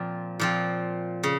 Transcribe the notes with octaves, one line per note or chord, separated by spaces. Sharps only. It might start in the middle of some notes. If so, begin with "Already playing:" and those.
Already playing: A#2 F3 C4
A#2 F3 C4
C#3